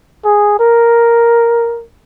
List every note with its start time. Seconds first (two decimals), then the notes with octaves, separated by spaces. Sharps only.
0.24 G#4
0.59 A#4